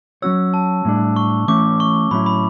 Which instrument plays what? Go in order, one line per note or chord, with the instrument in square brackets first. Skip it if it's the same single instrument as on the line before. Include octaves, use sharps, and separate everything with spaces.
[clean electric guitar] F#3 C#4 F#4 C#5 [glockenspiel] E6
[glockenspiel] A5
[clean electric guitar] A2 G3 D4
[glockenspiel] C#6
[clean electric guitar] E3 A3 C#4 [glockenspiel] D6
[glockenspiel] C#6
[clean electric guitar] A2 F#3 C#4 E4 [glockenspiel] B5
[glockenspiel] B5